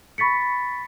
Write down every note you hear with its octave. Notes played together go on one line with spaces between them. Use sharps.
B5 C#6 A6 B6 C#7